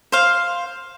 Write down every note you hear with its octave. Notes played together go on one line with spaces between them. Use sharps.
C5 F5